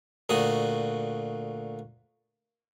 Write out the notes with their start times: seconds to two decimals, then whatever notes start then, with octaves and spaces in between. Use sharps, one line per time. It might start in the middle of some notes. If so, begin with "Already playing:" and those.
0.29 D2 A#2 F#4 D#6